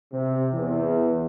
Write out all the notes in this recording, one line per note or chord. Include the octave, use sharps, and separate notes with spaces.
C3
E2